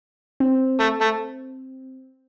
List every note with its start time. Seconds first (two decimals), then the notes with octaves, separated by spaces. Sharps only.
0.40 C4
0.80 A3
1.01 A3